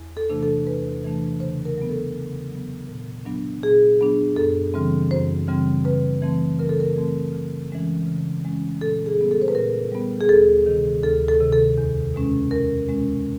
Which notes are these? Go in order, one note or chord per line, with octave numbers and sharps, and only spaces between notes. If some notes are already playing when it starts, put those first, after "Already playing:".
Already playing: E2
A4
C3 E3 A3 D4
A4
E2 B4
C3 E3 A3 D4
C#3 C5
A#4
F#3 B3
A4
C#3
F#3 B3
A#2
F#3 B3 D4
A#2 G#4
F#3 B3 D4
F#2 A4
C#3 E3 G3 C4
F#2 C5
C#3 E3 G3 C4
C#3 B4
E3 A3 C4
C#3 A#4
A4
A#4
E3 A3 C4
C#3
E3 G#3 C#4
C#3
E3 G#3 C#4
A#2 A4
G#4
G3 B3
A4
C5
B4
A#2 A#4
G3 B3
G#4
D2 A4
C3 D#3
D2 A4
A4
C3 D#3
A4
E2
B2 G#3 C#4
E2 A#4
B2 G#3 C#4